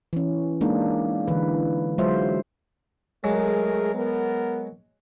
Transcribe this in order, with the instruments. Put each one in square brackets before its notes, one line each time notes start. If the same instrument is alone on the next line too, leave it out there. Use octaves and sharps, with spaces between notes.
[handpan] E3 C#4
G#3 A#3 D4 D#4
D3 E3 B4
F#3 G#3 F4 F#4 C5 E5
[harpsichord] F#3 G#3 [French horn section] A3 G#4 A#4
[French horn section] B3 A#4